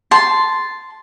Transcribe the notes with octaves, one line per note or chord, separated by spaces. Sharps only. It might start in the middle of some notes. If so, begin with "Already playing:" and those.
A5 C6